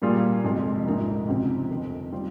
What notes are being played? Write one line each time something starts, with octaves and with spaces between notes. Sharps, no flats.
A#2 G3 A#3 F4 G#4
F1 F2 C3 F3 G#3
A#1 G#2 F3 A#3 D#4
C#2 C3 F3 C4 D#4
G1 F2 D#3
G3 C4 F4